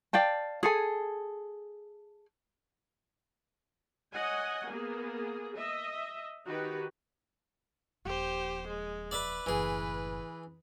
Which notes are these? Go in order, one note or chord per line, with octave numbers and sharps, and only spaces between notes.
D5 F5 G5 A5
G#4 A4 G#5
C#5 D#5 F#5 G#5
A#3 B3 G#4
D#5 E5
D#3 D#4 F#4 G4 B4
D#1 F3 G4 C5
G#3
B4 D5 E5 D6
F#1 A2 E3 G#4